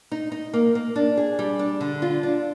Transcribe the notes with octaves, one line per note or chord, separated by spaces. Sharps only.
D#4
D#4
A#3
A#3
D4
G#4
G3
D4
D3
F4
D4